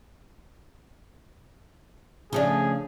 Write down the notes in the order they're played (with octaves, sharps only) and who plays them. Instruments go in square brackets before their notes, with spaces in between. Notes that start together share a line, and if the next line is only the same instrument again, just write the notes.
[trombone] C#3 [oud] F3 A3 D4 [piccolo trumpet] G#4